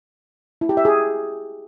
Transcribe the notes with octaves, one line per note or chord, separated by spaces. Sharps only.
E4
G4
E5
G#4